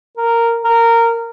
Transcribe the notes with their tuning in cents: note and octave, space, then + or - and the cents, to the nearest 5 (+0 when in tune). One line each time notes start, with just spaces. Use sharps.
A#4 -10
A#4 -15